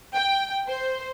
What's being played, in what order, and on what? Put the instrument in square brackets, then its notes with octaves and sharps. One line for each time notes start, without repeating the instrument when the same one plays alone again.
[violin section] G5
C5